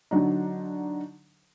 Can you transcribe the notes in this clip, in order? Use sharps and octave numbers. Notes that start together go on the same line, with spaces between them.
D3 F#3 D4 D#4